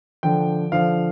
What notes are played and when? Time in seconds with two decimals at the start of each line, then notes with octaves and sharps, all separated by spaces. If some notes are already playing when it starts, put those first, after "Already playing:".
0.23 D3 F3 G5
0.72 D3 F3 F5